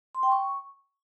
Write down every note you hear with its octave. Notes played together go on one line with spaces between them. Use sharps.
C6
G5
C#6